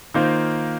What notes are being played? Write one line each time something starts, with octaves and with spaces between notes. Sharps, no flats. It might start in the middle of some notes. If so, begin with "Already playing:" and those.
D#3 A#3 F4 C5